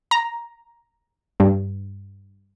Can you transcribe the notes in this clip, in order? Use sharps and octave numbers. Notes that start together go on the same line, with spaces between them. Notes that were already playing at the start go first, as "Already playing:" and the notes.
A#5
G2